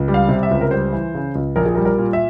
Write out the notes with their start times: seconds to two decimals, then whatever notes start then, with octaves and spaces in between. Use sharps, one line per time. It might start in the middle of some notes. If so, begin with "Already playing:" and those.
Already playing: C#2
0.08 G3
0.14 F5
0.29 C3
0.43 E5
0.51 C#2
0.61 A#4
0.71 G3 C5
0.93 E3
1.14 C#3
1.35 C#2
1.56 A#1 A#4
1.65 G#4
1.75 G3 A#4
1.85 A#4
1.98 A#2
2.13 E5